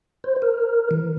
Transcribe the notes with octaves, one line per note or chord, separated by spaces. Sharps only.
C5
A#4
E3